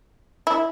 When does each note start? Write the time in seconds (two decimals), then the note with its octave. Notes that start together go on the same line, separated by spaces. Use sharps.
0.47 E4